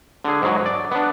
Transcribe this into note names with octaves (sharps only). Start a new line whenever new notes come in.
D3 G#4
G#2 F#3
D5
B3 D4